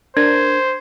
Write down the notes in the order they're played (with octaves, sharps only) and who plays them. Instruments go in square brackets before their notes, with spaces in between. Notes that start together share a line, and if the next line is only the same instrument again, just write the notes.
[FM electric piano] D4 A#4 [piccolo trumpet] C5 [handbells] G#6